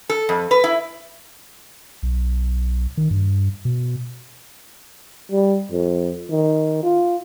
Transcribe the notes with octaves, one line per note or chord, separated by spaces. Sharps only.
A4
F2
B4
E4
B1
D#3
G2
B2
G3
F2
D#3
F4